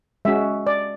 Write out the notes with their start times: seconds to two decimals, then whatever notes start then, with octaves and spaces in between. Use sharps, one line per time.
0.25 G#3 C#4 F#4 E5
0.67 D5